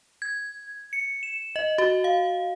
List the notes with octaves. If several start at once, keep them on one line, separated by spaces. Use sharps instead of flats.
G#6
C#7
E7
D#5
F#4
F5